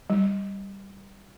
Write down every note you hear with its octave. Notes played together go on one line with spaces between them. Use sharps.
G3